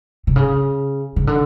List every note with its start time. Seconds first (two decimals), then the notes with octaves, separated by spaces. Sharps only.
0.27 C3
0.36 C#3
1.16 C#3
1.27 D3